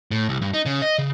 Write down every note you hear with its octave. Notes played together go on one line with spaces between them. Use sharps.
A2
C2
G2
D#4
C#3
D#5
C#3